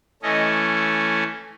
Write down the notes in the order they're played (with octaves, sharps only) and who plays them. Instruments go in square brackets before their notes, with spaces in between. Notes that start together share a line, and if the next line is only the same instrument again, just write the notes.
[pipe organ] E3 A3 C#4 D#5